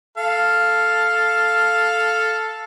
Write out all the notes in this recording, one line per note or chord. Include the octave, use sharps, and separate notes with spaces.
A4 F5